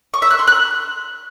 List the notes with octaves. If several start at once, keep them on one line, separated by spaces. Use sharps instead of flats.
C#6
E5
F#6
C6
F#6